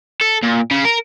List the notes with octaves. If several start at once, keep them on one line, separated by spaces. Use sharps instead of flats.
A4
A#2
C#3
A#4